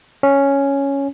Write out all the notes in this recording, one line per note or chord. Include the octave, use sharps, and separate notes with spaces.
C#4